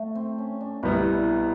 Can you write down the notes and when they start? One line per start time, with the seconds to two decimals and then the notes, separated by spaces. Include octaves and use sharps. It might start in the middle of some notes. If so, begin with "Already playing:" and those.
Already playing: A3
0.15 C4
0.38 C#4
0.61 D4
0.83 C2 B2 G3 B3 E4
1.13 D4